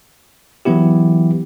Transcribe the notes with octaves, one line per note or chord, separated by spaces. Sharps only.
E3 F#3 B3 E4 G4